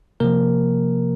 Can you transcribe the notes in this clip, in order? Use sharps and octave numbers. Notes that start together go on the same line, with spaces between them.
C3 F3 A#3 A#4